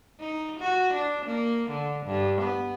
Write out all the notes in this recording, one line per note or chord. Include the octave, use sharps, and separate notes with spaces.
D#4
F#4
D4
A#3
D3
G2
B3